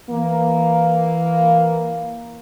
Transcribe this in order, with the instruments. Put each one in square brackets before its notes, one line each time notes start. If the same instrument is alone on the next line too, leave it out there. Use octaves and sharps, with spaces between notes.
[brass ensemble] E3 A#3